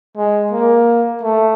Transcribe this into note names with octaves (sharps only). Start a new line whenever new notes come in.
G#3
A#3
A3